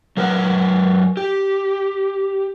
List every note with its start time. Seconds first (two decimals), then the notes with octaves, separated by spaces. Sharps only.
0.17 F#3 A#4 B4 F#5
1.17 G4